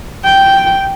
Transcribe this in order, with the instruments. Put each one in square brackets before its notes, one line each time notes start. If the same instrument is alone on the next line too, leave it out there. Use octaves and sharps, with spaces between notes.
[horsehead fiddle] G5